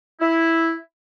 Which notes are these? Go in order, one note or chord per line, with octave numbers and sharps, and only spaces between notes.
E4